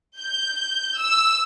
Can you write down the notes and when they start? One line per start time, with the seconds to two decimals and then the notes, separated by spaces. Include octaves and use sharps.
0.19 G6
0.99 E6